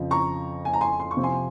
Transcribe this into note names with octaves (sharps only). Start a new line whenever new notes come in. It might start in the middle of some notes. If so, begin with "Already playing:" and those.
Already playing: F2 C#3 F3
A#5 C#6
G#5
A#5
G#5 C6
C6
C#6
C3 F3 C4
G#5 C6